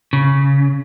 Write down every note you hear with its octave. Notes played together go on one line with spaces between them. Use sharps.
C#3